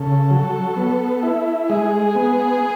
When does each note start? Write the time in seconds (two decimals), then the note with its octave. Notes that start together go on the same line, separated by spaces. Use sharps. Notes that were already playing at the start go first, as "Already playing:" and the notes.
Already playing: C#3 A4
0.31 F#3
0.77 B3
1.23 E4
1.69 G#3 G#4
2.15 B3